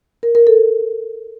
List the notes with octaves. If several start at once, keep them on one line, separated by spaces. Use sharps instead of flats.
A#4
A#4
A4